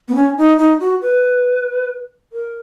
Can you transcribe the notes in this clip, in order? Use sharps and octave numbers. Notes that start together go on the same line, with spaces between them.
B3
C#4
D#4
D#4
F#4
B4
A#4